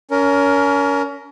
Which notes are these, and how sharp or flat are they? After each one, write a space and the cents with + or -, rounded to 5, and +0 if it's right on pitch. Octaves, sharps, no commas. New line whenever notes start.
C#4 +30 A#4 +0